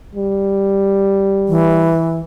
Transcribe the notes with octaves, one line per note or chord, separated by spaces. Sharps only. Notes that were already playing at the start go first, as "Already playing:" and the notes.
G3
E3